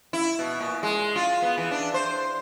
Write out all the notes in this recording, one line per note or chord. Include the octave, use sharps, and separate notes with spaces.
E4
B2
A#2
G#3
F4
B3
E3
D4
C5